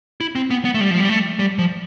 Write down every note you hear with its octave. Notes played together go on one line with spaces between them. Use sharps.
E4
C4
B3
B3
A3
G3
F3
G3
A3
G3
F3